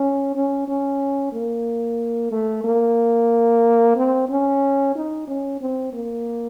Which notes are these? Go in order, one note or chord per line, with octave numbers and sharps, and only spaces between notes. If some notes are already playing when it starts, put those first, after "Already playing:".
Already playing: C#4
C#4
C#4
A#3
A3
A#3
C4
C#4
D#4
C#4
C4
A#3